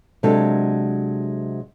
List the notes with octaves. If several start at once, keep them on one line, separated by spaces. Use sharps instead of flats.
C3 F#3 G#3 D4 G4 A4